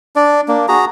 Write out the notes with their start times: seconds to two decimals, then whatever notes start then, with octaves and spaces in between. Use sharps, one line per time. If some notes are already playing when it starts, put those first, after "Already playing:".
0.16 D4 D5
0.48 A#3 D4
0.68 F#4 G#4 A#5